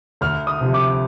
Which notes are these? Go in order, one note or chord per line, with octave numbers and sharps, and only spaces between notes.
D2 F6
D#6
C3 F3
D6